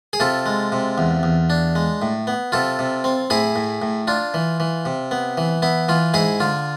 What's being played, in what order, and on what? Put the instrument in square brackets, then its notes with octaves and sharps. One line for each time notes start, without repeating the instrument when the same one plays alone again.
[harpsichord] G#4
C3 F4 A4
G#3
C3
E2
E2
D4
G#3
A2
B3
C3 F4 A4
C3
C4
A2 E4 G#4
A2
A2
D4 F4
E3
E3
C3
B3
E3
B3 E4
E3 F4
G#2 E4 G#4
D3 F4